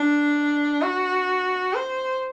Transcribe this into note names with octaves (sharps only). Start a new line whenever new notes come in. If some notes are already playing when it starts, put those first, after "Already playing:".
Already playing: D4
F#4
C5